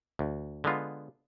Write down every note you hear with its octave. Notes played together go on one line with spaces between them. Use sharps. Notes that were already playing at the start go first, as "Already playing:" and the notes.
D2
D3 G#3 B3 F4